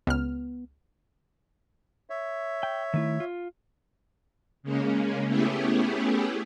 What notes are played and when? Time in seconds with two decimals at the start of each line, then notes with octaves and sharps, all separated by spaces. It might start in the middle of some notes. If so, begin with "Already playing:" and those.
0.07 C#2 B3 F6
2.10 C#5 E5
2.63 G5
2.94 D#3 A3 E4
3.20 F4
4.63 C#3 G#3 A#3 C#4
5.28 A3 B3 C#4 E4 G4 G#4